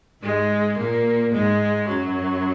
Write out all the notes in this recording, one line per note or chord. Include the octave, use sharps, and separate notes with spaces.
G#2 G#3
A#2 A#3
G#2 G#3
F#2 F#3